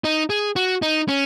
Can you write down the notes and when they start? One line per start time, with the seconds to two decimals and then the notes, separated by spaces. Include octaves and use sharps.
0.04 D#4
0.30 G#4
0.56 F#4
0.82 D#4
1.08 C#4